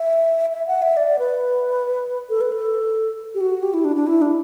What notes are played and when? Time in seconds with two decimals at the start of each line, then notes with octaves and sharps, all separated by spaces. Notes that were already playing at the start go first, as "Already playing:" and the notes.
Already playing: E5
0.52 E5
0.68 F#5
0.82 E5
0.97 D5
1.19 B4
2.30 A4
2.41 B4
2.52 A4
3.35 G4
3.41 F#4
3.62 G4
3.74 E4
3.84 D4
3.96 D4
4.07 E4
4.22 D4